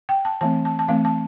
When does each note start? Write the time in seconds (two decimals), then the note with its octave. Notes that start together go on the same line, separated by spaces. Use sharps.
0.09 G5
0.25 A5
0.41 E3 A3 C4 A5
0.65 A5
0.79 A5
0.88 E3 A3 C4 F5
1.05 A5